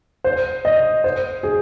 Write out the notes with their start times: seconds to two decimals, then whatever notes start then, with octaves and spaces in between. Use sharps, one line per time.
0.24 C5
0.65 D#5
1.04 C5
1.43 G#4